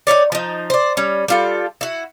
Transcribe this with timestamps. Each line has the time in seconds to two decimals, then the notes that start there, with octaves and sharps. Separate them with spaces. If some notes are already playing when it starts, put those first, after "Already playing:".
0.07 D#4 E4 C#5 D5
0.32 F3 D#4
0.70 C5 D5
0.97 G3 C#4
1.28 G3 F4 A4
1.81 E4 F#4